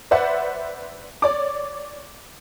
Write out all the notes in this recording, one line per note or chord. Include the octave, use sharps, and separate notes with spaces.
B4 C5 D5 E5 F#5
C#5 D5 D6